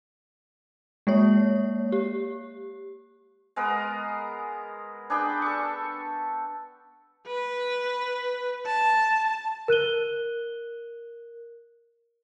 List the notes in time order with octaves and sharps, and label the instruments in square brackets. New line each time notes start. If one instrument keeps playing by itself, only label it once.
[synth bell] G#3 A#3 C#5
G4
[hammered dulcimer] G#3 B3 A#4
D4 G#4 B4 G5
A4 C#6
[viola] B4
A5
[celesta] A#4 F#6 D#7 G7